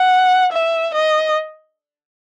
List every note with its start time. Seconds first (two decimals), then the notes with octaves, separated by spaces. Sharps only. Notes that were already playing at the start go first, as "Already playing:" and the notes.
Already playing: F#5
0.52 E5
0.94 D#5